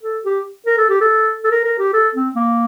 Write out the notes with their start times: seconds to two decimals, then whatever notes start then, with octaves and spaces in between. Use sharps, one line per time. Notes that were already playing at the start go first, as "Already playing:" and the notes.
0.03 A4
0.25 G4
0.66 A#4
0.78 A4
0.90 G4
1.01 A4
1.44 A4
1.51 A#4
1.65 A#4
1.79 G4
1.93 A4
2.15 C4
2.35 A#3